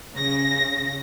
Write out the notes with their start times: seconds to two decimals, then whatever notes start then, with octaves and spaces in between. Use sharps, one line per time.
0.14 C#3 A#6